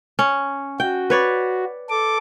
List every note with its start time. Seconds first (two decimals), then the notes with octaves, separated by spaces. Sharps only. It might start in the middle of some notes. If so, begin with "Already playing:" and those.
0.19 C#4
0.80 F#4 G5
1.10 B4 C#5 D5
1.90 A4 D6